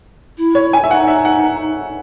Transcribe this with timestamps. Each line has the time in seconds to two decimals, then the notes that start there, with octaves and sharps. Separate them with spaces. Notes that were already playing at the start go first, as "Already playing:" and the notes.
0.37 E4
0.55 C#5
0.73 G#5
0.84 E5
0.91 D#4 F#5
1.08 E5
1.25 F#5